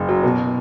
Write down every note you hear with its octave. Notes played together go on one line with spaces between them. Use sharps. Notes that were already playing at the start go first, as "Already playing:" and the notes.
Already playing: F#1
F#3
B2